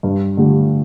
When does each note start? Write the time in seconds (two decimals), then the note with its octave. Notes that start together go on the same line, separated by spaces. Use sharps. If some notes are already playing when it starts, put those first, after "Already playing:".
0.03 G2
0.37 D3 A3 G4